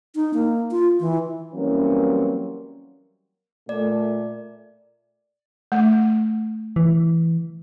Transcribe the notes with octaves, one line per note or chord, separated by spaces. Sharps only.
D#4
A#3
F4
E3
E3 F#3 G3 A#3 C4 C#4
A#2 A3 D5
A3
E3